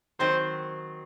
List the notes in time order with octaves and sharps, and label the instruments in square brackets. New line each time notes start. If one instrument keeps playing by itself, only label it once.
[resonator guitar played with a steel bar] D#3 F#3 C4 [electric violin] C5